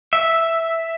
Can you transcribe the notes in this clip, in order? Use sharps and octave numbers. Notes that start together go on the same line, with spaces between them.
E5